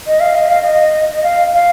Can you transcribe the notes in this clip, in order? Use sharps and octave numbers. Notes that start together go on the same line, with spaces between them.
D#5
F5
D#5
F5
D#5
D#5
F5
F5